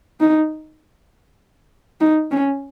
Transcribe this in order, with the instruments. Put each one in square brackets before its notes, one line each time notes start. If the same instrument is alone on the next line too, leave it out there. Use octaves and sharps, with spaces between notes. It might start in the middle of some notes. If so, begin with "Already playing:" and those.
[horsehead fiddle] D#4
D#4
C#4